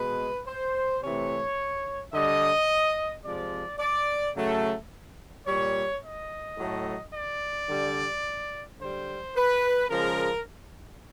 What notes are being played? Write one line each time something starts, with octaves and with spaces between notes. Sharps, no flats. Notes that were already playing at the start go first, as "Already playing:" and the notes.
Already playing: B2 G#3 B4
C5
C3 E3 A3 C#5
D3 G3 D#5
C3 F3 G#3 D5
D5
C#3 F#3 A3
A#2 G3 C#5
D#5
A2 F#3 A3
D5
D3 G3
D3 G3 C5
B4
C#3 F3 G#3 A#4